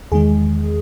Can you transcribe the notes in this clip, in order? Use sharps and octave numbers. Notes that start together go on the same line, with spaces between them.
E2 D#3 G#3 G#4